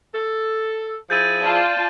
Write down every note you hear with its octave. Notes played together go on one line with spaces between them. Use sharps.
A4
F3 E4 G#4 G6 A6 D#7
F4 D5 A5